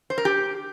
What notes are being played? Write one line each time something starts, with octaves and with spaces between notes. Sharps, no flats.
C5
A#4
G4